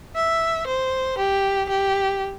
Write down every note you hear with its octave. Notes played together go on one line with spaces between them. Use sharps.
E5
C5
G4
G4